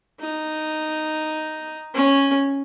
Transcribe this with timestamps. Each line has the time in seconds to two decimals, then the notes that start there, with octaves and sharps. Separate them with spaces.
0.20 D#4
1.94 C#4